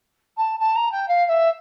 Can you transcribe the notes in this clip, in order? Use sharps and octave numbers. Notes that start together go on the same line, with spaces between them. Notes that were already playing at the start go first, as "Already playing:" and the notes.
A5
A5
A#5
G5
F5
F5
E5